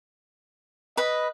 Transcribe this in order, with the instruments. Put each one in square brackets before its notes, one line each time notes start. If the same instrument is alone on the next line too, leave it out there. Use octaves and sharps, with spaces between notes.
[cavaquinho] B4 B5 [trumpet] D#5